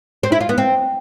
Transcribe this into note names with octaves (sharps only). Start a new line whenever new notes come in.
C4
E4
F4
B3
C4